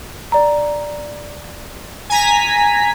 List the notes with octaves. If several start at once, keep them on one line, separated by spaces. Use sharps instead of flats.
D5 A#5
G#5 A#5 B6